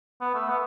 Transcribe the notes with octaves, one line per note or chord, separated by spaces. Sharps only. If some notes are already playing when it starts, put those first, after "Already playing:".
B3
A3
B3